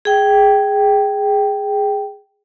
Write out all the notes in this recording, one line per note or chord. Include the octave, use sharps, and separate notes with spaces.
G#4 G5